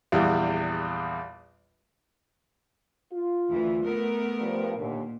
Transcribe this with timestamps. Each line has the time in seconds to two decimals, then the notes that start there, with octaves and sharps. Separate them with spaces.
0.12 A#1 E2 E3 G3
3.12 F4
3.50 D2 E3
3.83 A3 B3 A#4
4.40 G2 F3
4.78 D#2 A#2 D3